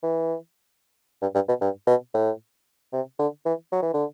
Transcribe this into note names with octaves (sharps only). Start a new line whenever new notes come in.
E3
G2
G2
B2
G2
B2
A2
C3
D3
E3
F#3
E3
D3